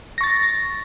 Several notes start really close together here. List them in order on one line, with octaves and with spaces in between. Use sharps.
A#6 C#6 A6